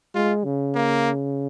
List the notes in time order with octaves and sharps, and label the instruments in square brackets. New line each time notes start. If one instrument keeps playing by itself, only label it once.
[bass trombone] G#3 [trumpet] F4
[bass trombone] C#3
[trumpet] A#3